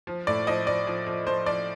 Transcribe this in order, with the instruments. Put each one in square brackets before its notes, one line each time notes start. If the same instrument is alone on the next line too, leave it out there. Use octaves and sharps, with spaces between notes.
[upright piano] F3
A2 D5
F3 D#5
F3 D5
F3
F3
F3 C5
F3 D5